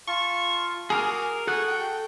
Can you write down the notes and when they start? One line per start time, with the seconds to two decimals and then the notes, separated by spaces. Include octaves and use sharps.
0.08 F4 F5 A5 C#6
0.90 F#4 G#4 A#4 D6 F6
1.47 F#4 G#4 A4 F#6
1.68 G5